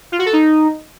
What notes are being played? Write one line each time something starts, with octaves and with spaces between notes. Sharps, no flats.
F4
F#4
A4
D#4